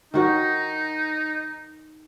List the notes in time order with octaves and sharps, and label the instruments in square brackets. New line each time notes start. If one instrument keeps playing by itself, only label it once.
[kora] D#3 F#4 C#5 [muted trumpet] D#4